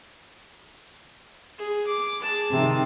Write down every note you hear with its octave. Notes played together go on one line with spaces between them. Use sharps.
G#4
D6
G#4 A5
C3 D#3